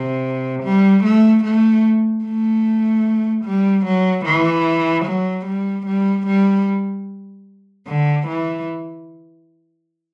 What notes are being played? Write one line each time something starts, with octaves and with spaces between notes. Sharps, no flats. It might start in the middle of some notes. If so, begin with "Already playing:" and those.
Already playing: C3
G3
A3
A3
A3
G3
F#3
E3
F#3
G3
G3
G3
D3
E3